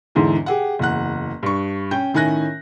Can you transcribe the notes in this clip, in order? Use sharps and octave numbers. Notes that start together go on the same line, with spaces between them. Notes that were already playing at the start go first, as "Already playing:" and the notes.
E2 G#2 D3 E3
G4 G#4 F#5
F#1 E2 F#5 F#6
G2 C#6
C#4 G5 G6
A2 D#3 C#4 G#5 F#6 A#6